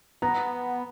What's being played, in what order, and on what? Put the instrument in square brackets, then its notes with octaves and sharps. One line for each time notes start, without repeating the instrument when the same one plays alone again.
[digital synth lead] B3 [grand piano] A#5